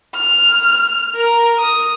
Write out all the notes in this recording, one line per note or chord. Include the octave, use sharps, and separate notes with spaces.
F6
A#4
D#6